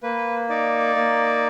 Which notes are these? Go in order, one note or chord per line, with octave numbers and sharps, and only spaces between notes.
A#3 B4
D#4 D5
A#3